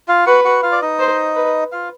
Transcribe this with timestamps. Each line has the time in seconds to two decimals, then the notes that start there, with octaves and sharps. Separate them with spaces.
0.08 F4 F5
0.26 F#4 B4 F#5
0.44 F#4 F#5
0.63 F4 F5
0.72 D5
0.82 D#4 D#5
0.99 C5
1.36 B4
1.72 F4 F5